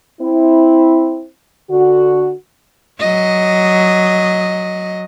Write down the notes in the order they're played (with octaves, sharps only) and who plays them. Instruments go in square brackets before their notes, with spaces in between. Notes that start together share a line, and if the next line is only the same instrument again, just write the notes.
[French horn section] C4 E4
D3 F#4
[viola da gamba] F#3 D#5